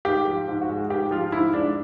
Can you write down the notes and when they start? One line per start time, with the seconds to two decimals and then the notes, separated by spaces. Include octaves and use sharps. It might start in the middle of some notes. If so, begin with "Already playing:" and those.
0.05 G#2 G4
0.27 F3
0.48 G#2
0.61 F#4
0.69 G#3
0.90 G#2 G4
1.11 F3 F4
1.32 G#2 E4
1.53 G#3 D4